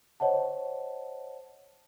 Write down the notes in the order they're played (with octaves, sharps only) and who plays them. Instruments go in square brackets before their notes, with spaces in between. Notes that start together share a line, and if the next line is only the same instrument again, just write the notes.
[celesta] C5 C#5 D#5 F#5 A5